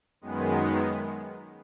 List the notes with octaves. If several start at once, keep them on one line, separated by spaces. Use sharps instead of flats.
F#2 D#3 G#3 B3